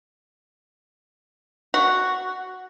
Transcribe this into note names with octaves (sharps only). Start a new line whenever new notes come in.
F#4